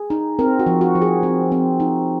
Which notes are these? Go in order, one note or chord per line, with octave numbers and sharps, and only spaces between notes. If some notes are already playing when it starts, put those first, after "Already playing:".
Already playing: G#4
D#4
C4 A#4
F#4
F3
F#4
F3
G#4
C4
C4
D#4